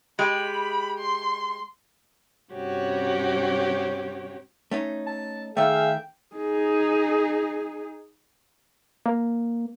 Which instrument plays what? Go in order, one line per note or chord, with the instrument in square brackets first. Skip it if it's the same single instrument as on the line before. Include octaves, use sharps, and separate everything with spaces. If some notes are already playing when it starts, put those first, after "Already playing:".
[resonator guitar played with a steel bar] G#3 G4 [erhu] B5
[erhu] C6
[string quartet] G2 C3 C#4 F#4 G4 C#5
[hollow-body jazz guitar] A3 C#4 D#4
[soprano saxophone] A5
[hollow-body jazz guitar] D#3 A3 [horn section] G#4 E5 F5 [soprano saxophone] G5
[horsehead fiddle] D#4 G#4
[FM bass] A#3